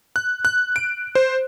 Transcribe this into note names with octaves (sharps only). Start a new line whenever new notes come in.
F#6
F#6
D7
C5